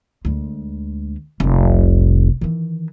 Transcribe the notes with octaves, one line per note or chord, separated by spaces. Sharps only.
D2 G#3
F1 C2
D#3 E3